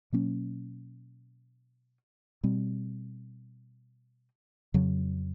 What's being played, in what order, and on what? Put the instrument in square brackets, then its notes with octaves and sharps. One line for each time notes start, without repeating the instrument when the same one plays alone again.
[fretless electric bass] B2 F#3 A#3 C#4
B2 G3 C4
F2 C#3 F#3